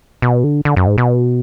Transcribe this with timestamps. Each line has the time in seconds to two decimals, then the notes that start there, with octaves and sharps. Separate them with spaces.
0.22 B2
0.44 D3
0.65 D3
0.76 F#2
0.87 G#2
0.98 B2